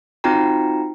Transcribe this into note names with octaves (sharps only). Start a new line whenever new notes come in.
C4 D#4 F4 F#4 G5 A#5